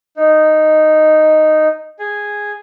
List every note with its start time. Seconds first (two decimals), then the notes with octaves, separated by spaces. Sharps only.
0.17 D#4
1.99 G#4